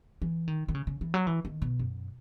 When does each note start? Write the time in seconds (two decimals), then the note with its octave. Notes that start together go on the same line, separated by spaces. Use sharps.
0.22 E3
0.48 D#3
0.69 D#3
0.75 C#3
0.87 C#3
1.01 E3
1.14 F#3
1.27 E3
1.45 D#3
1.62 B2
1.79 F#2